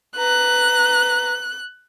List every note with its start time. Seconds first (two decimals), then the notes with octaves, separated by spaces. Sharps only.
0.18 B4 A#5 F#6